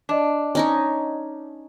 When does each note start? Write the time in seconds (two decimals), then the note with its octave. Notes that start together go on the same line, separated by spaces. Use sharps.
0.09 D4 D5 D#5 D6
0.55 C#4 D#4 C#5